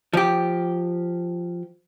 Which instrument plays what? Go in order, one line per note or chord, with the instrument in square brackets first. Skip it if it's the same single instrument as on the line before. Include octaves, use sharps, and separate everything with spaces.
[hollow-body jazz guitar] F3 G4